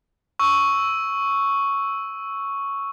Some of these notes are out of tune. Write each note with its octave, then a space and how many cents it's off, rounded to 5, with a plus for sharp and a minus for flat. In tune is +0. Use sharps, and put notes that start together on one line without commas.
C#6 +0 E6 -5